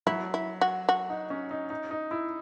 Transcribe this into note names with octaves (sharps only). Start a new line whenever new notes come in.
F#3 E4
E4
F#4
F#4
D#4
C#4
D#4
D#4
D#4
E4